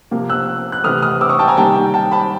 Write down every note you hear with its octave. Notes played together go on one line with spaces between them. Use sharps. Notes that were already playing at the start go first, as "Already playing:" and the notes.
C3 F3 A#3
E6 F#6
F#6
C3 E3 A3 D#6 F6
D#6 F6
D6 E6
C#6 D#6
G5 A5
G#5 A#5
C3 D#3 G3 A#3 G5 A5
G5 A5
A5 B5